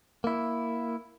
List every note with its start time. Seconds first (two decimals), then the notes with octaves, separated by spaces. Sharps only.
0.24 A#3 E4